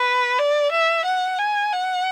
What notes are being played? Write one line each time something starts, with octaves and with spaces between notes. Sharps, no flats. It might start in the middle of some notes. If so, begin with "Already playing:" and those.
Already playing: B4
D5
E5
F#5
G#5
F#5